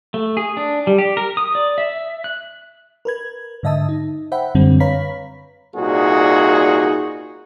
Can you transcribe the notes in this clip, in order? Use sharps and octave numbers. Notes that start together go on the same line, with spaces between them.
A3
G#4
D4
G3
G4
A#4
D#6
D5
E5
F#6
A#4 B4 G#6
G#2 D3 D#5 E5 A5 D#6
D#4
C5 E5 F#5 G5 B5
F#2 D3 G3 C4
B4 C#5 F5 A#5 B5 B6
C2 A#2 D#4 F#4 G#4